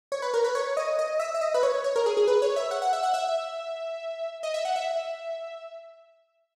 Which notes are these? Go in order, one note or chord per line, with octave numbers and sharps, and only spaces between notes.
C#5
B4
A#4
B4
C#5
D#5
D#5
E5
E5
D#5
B4
C#5
C#5
A#4
G#4
G#4
B4
C#5
E5
F#5
F#5
E5
F#5
E5
D#5
E5
F#5
E5